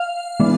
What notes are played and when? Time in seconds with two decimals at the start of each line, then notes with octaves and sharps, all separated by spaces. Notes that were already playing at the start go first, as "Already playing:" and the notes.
Already playing: F5
0.40 E3 G#3 B3 D4